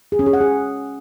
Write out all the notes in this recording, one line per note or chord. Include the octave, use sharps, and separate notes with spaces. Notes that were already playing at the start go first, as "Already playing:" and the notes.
G#4
C#4
G#4
F#5
G#4